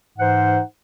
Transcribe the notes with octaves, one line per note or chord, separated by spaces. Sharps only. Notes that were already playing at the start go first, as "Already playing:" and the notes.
G#2 E3 D#4 C5 F#5